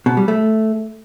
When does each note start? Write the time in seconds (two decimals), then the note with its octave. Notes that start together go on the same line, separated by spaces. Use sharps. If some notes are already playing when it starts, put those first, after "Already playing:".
0.06 B2
0.17 G3
0.28 A3